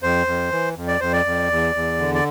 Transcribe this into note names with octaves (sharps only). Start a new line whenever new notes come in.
F2 C5
F2
E3
F2
D5
F2 C5
D5
F2
E2
E2
D3
D5